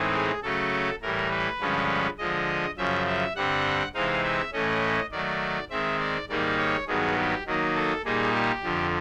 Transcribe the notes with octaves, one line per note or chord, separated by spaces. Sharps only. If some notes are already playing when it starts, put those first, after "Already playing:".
Already playing: A2 E3 G#3 C4 D#4
G#4
C#3 F#3 A3 C#4 A4
A2 E3 G3 A#4
B4
G2 D3 F3 G#3 C#4
D3 F3 G#3 D#5
F#2 C#3 F3 E5
E5
G2 D3 G3 C4 F#5
C3 E3 G#3 C4 D#4 F5
E5
A2 E3 A3 C#4 D#5
D#3 F#3 A3 D5
D#3 G#3 C4 E5
D5
G#2 D#3 G3 A#3 D#4 D5
C#5
G2 D#3 F#3 B3 G#4
G4
D#3 F#3 A#3 D#4
A4
A#2 G3 A#3 D#4 G#4
G4
F2 D3 F3